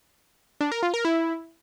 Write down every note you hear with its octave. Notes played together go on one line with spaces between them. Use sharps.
D4
A#4
F4
A#4
E4